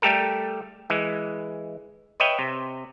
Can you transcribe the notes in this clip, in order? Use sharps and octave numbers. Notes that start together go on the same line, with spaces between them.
G3 A3 G4 A4 A#4
E3 G#3
B4 C#5 D#5 E5 G5
C3